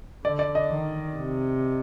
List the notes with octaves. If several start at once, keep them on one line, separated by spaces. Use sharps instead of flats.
D3 D5
D5
D#5
D#3
C3